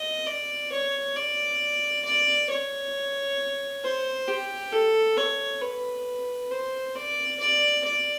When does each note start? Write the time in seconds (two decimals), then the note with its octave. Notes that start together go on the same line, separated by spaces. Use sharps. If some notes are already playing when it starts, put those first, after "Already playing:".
Already playing: D#5
0.27 D5
0.72 C#5
1.16 D5
2.05 D5
2.50 C#5
3.84 C5
4.28 G4
4.72 A4
5.17 C#5
5.62 B4
6.51 C5
6.95 D5
7.40 D5
7.85 D5